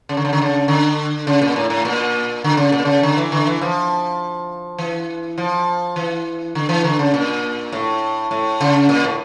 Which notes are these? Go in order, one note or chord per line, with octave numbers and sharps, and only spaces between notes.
C#3
D3
C#3
D3
C#3
D3
C#3
A#2
A2
A2
A#2
D3
C#3
A#2
C#3
D3
E3
D3
E3
F3
E3
F3
E3
D3
E3
D3
C#3
A#2
A2
A2
C#3
A#2
A2